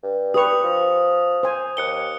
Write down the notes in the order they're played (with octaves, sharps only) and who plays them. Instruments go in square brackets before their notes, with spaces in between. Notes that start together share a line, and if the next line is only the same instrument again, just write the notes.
[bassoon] G2
[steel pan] G4 B4 C#6 [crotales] D#6 F7
[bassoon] F3
[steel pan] C5 G#5
[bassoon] D#2 [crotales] F#6 C#7 G7